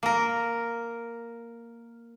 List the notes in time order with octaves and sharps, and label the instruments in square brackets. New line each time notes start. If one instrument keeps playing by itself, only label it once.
[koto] A#3 A#4